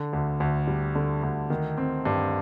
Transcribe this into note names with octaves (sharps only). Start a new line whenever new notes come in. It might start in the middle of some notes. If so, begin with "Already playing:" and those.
Already playing: D3
D2
D2
G3
D3
D2
D#3
C4
G2